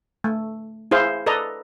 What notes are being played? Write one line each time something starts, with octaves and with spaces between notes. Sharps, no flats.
A3
E4 G#4 C5 F5
A4 B4 D5 D#5 A#5